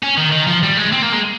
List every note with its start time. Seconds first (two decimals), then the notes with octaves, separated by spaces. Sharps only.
0.03 C#4
0.17 D#3
0.32 D#3
0.47 F3
0.63 G3
0.77 G#3
0.92 C4
1.02 A#3
1.13 G#3